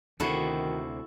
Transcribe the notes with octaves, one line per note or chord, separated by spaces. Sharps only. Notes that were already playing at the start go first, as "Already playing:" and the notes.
D2 C3 D#3 E4 F#4 A4